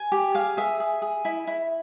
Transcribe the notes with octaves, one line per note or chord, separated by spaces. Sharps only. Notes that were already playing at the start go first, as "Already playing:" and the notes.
Already playing: G#5
G4
G#4 F5
G#4 E5
G#4
G#4
E4
E4